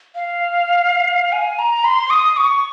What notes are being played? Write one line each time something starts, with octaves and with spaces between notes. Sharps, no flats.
F5
G#5
A#5
C6
D#6
C#6